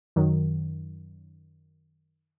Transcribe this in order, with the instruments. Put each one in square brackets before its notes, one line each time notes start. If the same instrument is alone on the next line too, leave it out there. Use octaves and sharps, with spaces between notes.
[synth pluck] F#2 D#3 F#3